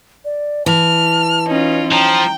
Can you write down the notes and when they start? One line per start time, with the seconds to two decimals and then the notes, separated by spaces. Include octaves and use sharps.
0.25 D5
0.66 E3 A5 F6
1.46 C#4 D#4 F4
1.92 F3 G5 A#5